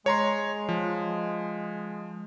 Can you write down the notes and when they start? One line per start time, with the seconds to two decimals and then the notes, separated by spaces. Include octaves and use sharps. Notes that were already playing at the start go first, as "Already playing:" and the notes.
0.06 G#3 C#5 A#5 C6
0.69 F3